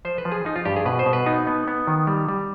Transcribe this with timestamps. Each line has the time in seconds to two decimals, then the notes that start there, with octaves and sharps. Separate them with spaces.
0.05 F3 C5
0.18 B4
0.25 F3
0.32 G#4
0.45 F3 D#4
0.56 F4
0.65 G2 G4
0.76 G#4
0.85 B2 B4
0.99 C5
1.06 B2
1.13 B4
1.26 B3 D#4
1.47 B3
1.68 B3
1.87 D#3
2.07 G3
2.29 G3